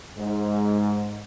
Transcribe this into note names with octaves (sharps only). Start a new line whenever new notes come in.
G#2